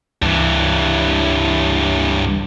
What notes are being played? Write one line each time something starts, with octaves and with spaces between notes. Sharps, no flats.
C#2 G2 E3